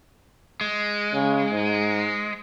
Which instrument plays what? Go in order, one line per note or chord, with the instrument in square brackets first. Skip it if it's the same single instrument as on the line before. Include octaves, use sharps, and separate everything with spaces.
[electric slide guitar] G#3
[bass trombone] C#3
G#2